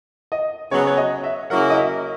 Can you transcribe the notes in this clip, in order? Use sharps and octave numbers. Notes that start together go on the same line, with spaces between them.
D#5
C#3 F#3 B3 C#5
C#5
D#5
E5
C#3 F#3 A#3 E4 A#4 F#5
D#5
E5